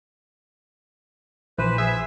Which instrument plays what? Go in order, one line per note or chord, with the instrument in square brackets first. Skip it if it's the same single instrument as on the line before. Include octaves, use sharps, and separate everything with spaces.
[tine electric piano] A#1 [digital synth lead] E3 [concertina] B4 C5
[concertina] G#4 [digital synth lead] E5